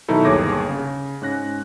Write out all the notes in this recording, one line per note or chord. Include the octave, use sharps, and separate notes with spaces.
B2 D#3 F#3 D#4 E4 A4
G1 D#2 G#4 C#5 D6 A#6
C#3
G#2 C#4 F#6 A#6